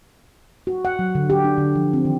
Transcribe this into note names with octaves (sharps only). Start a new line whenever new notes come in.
F#4
F#5
F#3
D3
G4
D4
D3
F3
C4
D#3